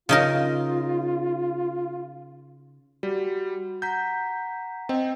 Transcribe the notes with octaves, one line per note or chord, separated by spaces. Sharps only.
C#3 D#4 F4 A#4
G3 F#4
F#5 A#5 G6 B6
C4 D#5 G5